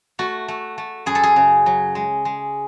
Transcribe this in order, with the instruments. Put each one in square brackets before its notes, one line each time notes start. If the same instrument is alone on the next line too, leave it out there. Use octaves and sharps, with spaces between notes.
[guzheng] A3 F#4
A3
A3
F#2 G#4
A4
G#4
C#3
F#3
G#3
G#3